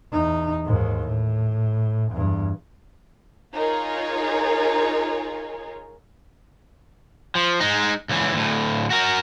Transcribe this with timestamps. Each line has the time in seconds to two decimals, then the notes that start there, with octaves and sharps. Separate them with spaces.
0.12 E2 D#4
0.65 D#2 G#2
1.06 A2
2.12 E2 G2
3.53 D#4 F4 G#4 A#4 C#5
7.35 F3
7.60 G#3 D#4
8.09 C#2 E3
8.34 D2 A2
8.90 F#4 A#4